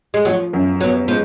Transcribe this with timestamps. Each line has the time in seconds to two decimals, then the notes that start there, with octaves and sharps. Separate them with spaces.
0.14 G#3
0.25 F3 F#3
0.53 F#2
0.81 F#3 B3
1.08 F3 G#3